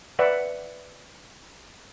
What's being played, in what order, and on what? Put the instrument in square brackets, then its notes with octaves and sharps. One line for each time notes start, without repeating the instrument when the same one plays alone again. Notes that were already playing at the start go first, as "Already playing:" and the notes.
[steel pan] B4 D5 E5 F#5